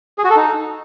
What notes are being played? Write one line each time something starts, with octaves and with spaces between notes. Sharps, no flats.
G#4
F#4
A4
D#4